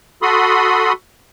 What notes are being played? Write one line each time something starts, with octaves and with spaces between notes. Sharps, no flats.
F#4 A4 B5 C6 D#6